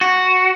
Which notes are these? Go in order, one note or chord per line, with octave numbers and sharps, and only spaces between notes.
F#4